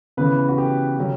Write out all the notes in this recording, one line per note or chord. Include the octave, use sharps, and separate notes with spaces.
C#3 E3 B3 B4
F#4
G4
C#3 F#3 C#4